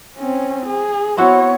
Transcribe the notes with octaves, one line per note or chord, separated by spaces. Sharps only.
C4 C#4
G#4
B3 C4 E4 F#4 C#5